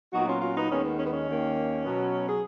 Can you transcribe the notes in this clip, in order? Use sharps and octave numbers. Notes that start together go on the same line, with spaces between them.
A#2 F#3 B3 D#4 F#4
C#4 F4
C#4 F4
B3 D#4
D#2 D#3 G#3 B3 C#4
B3
C#4
B3
C#4
D#2 D#3 A#3
B2 F#3 B3
G#4